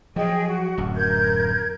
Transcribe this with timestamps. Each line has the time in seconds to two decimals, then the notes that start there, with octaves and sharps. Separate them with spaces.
0.16 F3 F#3 G#4 D#5 G5
0.47 F#4
0.78 D1 F#2
0.96 A#4 G6 G#6